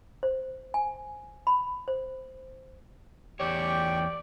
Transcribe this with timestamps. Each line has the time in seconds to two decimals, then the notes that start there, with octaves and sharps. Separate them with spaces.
0.23 C5
0.74 G#5
1.47 B5
1.88 C5
3.40 E2 G4 C#5 D5 G5 C#6